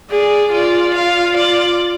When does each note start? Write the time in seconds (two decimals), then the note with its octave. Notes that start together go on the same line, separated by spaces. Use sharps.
0.10 G#4 D5
0.52 F4 D5
0.94 F5
1.36 D5